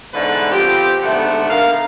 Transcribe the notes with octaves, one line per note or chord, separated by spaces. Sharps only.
G#2 B2 D3 E3 B4
F3 C4 G4
G#2 D3 A3 B3
D3 A#4 F5